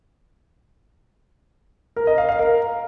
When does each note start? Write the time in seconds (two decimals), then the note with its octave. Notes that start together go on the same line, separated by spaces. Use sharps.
1.96 A#4
2.07 D#5
2.18 F5
2.29 F5
2.39 A#4